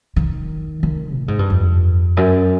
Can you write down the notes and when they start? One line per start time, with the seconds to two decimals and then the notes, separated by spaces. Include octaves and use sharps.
0.16 D#3
0.83 D#3
1.17 A2
1.28 G#2
1.39 G2
1.50 F2
2.17 F#2